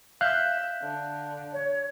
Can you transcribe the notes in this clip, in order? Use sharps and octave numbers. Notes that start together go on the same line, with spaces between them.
E5 F5 F#6 G6
D3
C#5